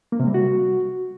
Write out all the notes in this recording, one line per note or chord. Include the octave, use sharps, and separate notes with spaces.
A#3
C3
G3
F#4